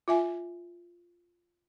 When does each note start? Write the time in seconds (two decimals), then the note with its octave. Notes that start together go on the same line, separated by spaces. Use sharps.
0.08 F4 E5 G#5